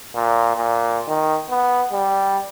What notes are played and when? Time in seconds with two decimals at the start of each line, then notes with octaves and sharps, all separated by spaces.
0.15 A#2
0.57 A#2
1.08 D#3
1.50 B3
1.92 G3